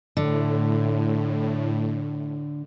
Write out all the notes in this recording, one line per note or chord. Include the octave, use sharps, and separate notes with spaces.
A2 D3